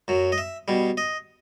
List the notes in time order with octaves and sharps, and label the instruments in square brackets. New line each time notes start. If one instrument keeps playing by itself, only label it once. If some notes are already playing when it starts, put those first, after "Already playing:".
[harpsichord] F#2 F#3
D#5
E5
B2 G3
D#5